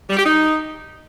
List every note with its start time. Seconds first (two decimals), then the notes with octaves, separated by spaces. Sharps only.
0.09 G3
0.17 G4
0.25 D#4